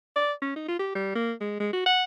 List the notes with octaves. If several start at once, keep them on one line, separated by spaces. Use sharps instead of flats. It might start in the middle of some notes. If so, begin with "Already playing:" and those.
D5
C#4
D#4
F4
G4
G3
A#3
G#3
G#3
F#4
F#5